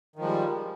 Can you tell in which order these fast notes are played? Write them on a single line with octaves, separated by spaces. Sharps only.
D#3 F3 G#3 G3